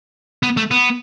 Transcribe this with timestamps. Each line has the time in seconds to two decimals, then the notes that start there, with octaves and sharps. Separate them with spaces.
0.43 B3
0.57 A3
0.71 B3